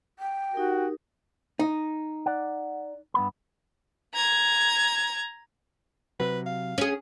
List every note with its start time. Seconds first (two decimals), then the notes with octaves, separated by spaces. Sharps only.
0.19 G5
0.54 D#4 F#4 G4 A#4
1.59 D#4
2.26 D5 F#5
3.14 G2 B3 B5
4.14 A#5 G#6
6.20 C3 F#3 B4
6.46 F5
6.78 C#4 G#4